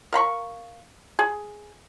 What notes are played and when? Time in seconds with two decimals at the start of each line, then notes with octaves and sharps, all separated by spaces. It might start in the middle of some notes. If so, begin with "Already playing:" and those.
0.13 A#4 F5 B5 C#6
1.19 G#4